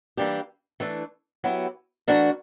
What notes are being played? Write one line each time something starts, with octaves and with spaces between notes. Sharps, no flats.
E3 G3 A#3 D4 G4
E3 A3 D4
F#3 B3 E4 G4
E3 A3 D4 F#4 A#4